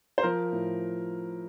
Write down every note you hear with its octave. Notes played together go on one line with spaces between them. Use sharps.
C5
F3 A#4
A2